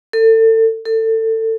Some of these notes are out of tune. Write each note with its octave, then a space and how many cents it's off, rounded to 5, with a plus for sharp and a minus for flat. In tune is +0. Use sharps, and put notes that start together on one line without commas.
A4 +30
A4 +25